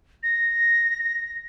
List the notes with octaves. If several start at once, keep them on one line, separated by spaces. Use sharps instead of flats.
A#6